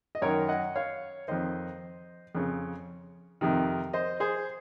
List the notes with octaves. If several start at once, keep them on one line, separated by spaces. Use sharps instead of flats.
D#5
F#2 D#3 A#4 C#5
D#5 F#5
C#5 F5
F2 D#3 C5 D#5
F2 C#3
F2 C3 D#3
C5 D#5
G#4 C5